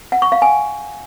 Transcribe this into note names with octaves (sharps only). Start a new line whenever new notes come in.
F#5
C#6
F5
G#5